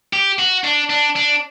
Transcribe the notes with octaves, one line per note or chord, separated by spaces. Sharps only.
G4
F#4
D4
D4
D4